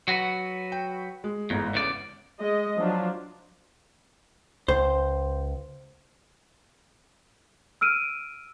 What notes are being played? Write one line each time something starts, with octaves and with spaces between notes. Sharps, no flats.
F#3 F#4 B4
G5
G#3
G1 E2 G#2
E2 C#3 D5
G#3 D#5
F3 F#3 D4 F4
C#2 C5
E6 F6 D7 D#7